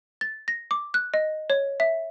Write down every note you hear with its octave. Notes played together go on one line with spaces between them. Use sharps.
A6
A#6
D6
F#6
D#5
C#5
E5